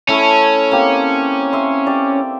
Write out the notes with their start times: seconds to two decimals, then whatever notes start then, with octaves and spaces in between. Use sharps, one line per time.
0.09 A3 C#4 E4
0.71 A#3 C4 G4
1.53 E5 C6
1.87 G4 D5